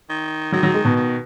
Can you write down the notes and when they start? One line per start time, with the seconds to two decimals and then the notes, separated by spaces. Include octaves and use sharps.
0.09 D#3
0.52 D#3 F#3
0.63 F#3
0.74 G#3
0.85 B2
0.96 D#3